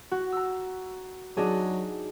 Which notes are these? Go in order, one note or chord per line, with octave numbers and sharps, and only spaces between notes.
F#4
A#5 E6
F#3 D4 D#4 G#4